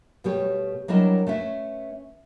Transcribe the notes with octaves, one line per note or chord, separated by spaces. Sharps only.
B2 G3 A3 G4 C#5
F#3 G3 D4 E4 A#4 D#5
A3 C#4 B4 E5